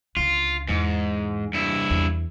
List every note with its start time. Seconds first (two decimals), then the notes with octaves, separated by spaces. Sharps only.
0.16 C#2 D3 F4
0.68 E2 G#2
1.53 G2 E4
1.91 E2